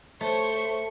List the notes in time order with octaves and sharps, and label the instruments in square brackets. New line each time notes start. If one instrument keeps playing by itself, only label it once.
[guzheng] A3 [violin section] C5 C#5 [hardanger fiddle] C#6